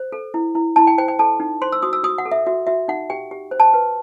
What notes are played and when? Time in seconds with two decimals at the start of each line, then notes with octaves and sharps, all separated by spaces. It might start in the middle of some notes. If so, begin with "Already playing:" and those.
Already playing: C5
0.12 A4
0.34 E4
0.55 E4
0.76 E4 A5
0.87 G5
0.98 C5 G5
1.08 G5
1.19 A4 A5
1.40 D#4
1.61 C5 C6
1.72 E6
1.82 F#4 D#6
1.93 E6
2.03 F#4 D#6
2.18 F#5
2.25 A4
2.32 E5
2.46 F#4 E5
2.67 F#4 E5
2.88 D#4 F#5
3.10 G4 G5
3.31 G4
3.51 C5
3.60 A5
3.74 B4